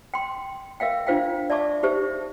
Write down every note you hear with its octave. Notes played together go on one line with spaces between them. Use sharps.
G5 C6
A#4 E5 F5 G5
D4 F4 C5 F5 G5
D5 E5 A5 C#6 D6
D#4 G4 C5 E5